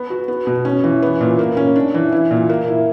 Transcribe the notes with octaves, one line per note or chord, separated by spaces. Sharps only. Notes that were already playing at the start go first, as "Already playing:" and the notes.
Already playing: B3
F#4
B3
B2
C#4
E3
B3
A#2
A#3
C#4
D4
E3
E4
A#2
A#3
E4